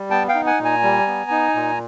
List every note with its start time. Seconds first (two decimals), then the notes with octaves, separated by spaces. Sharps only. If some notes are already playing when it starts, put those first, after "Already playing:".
Already playing: G3
0.10 B3 G5 A5
0.29 F5 G5
0.35 D#4
0.46 F#5 G#5
0.59 A#2
0.64 G#5 A#5
0.83 G3
1.07 B3
1.31 D#4
1.55 A#2